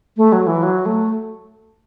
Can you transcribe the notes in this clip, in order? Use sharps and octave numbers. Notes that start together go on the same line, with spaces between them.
A3
F#3
E3
F#3
A3